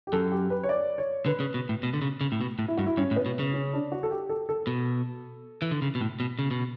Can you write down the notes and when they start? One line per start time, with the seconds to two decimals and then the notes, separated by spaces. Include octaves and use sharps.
0.07 G4
0.12 F#2 A4
0.32 G4
0.50 B4
0.63 C#5
0.69 D5
0.98 C#5
1.26 D3 B4
1.40 C#3
1.54 B2
1.69 A2
1.83 B2
1.94 D3
2.02 C#3
2.21 C#3
2.32 A2
2.41 B2
2.59 A2
2.68 E4
2.77 G2 F#4
2.86 E4
2.97 G2 C#4
3.11 A2
3.16 B3
3.26 B2
3.39 C#3
3.54 C#4
3.73 D4
3.92 F#4
4.03 A4
4.11 G4
4.29 A4
4.49 A4
4.67 B2
5.62 E3
5.71 D3
5.82 C#3
5.95 B2
6.01 A2
6.20 B2
6.39 C#3
6.51 B2